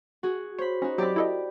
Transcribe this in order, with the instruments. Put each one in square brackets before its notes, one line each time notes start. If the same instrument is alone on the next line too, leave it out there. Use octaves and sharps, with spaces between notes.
[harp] F#4 G#4
[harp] C5 B5 [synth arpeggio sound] C#5
[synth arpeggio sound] C#4 [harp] D#4 F#4
[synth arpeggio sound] F#3 C4 [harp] G4 D5 B5
[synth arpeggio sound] E4 A4 D#5